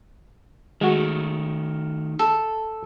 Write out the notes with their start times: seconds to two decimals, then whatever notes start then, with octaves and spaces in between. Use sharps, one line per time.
0.81 D#3 G#3 A3 F#4
2.19 A4